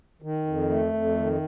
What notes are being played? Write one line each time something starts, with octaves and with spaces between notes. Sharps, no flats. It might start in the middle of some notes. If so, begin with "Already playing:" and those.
D#3
F2
A3
F2
D#3